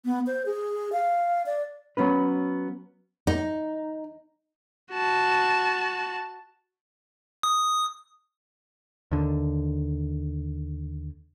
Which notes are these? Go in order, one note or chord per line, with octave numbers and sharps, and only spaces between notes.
B3
C5
G#4
F5
D5
F#3 B3 C#4 B4
D#4
F#4 A5
D#6
D#2 D3